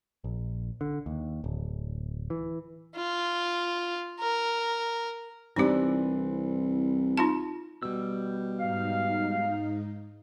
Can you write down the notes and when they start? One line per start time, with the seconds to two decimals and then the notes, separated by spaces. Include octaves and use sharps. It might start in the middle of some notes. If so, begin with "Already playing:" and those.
0.24 A#1
0.81 D3
1.06 D#2
1.44 D1
2.30 E3
2.96 F4
4.20 A#4
5.56 C2 E3 C4 D4 D#4 G4
7.18 D#4 F4 A5
7.83 B2 G3 E6
8.60 G#2 D#4 F5